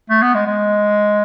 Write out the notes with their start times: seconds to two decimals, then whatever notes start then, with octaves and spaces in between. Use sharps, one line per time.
0.10 A3
0.22 B3
0.35 G#3
0.47 G#3